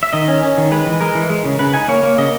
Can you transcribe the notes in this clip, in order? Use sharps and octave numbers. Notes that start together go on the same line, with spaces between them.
E5
D#3 D#5
C#4
C#4
D#3
G#3 B4
E3
G#3 A#4
E3
G#3
C#3
C#3 B4
D#4 G#5
A#3 C#5
A#3
C#3 D#5